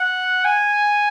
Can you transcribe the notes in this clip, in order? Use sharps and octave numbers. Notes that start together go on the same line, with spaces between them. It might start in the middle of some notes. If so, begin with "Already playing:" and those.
Already playing: F#5
G#5